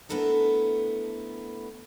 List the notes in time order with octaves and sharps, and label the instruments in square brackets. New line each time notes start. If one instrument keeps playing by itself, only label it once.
[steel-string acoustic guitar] A3 B3 D4 E4 A4 A#4